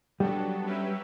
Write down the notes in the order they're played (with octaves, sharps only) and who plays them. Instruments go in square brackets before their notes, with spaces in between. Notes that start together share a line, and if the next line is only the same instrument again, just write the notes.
[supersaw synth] F#3 B3 D4 F#4 A4 [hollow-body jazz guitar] G3
[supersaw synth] F#3 C#4 G4 B4 E5